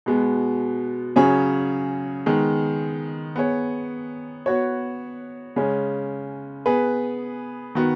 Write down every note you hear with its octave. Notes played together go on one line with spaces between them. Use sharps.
B2 G#3 B3
C#3 F#3 C#4 G#4 C#5
D#3 G#3 B3
B3 G#4 C#5
B3 F#4 C#5
C#3 G#3 C#4
B3 G#4 B4
D#3 B3 F#4